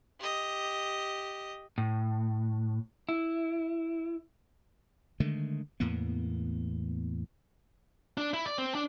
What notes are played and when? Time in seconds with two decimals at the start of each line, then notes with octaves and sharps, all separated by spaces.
0.19 G4 D#5
1.78 A2
3.09 E4
5.20 D3 D#3 G#3 A3
5.80 E2 A2 A#3 B3
8.18 D4
8.34 E4
8.46 D5
8.58 C4
8.75 D4